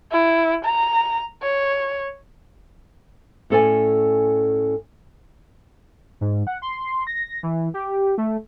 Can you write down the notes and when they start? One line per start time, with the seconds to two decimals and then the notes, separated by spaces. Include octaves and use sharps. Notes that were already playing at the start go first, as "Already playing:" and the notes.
0.12 E4
0.66 A#5
1.43 C#5
3.50 A2 C#4 A4 C5 D5 G#5
6.21 G#2
6.47 F#5
6.62 C6
7.07 A#6
7.43 E3
7.74 G4
8.18 A3